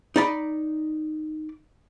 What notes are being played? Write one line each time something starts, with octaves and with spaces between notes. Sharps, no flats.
D#4 D5 B5